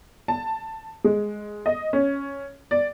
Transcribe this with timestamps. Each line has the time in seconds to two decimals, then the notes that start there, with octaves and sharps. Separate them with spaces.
0.28 A5
1.04 G#3
1.66 D#5
1.93 C#4
2.71 D5